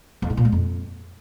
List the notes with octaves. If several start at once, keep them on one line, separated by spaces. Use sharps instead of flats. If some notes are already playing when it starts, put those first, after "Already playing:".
F2
G#2
A#2
G#3
F2